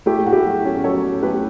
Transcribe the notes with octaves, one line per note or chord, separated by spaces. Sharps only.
A3 E4 G4
A2 F#4
E4 G4
F#3
C#4
F#3 A4 C#5
F#3
A3 G4 B4